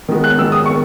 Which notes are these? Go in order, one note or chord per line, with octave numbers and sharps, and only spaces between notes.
D#3 G#3 B3
F#6
D#3 G#3 B3 E6
D#6
D#3 C#6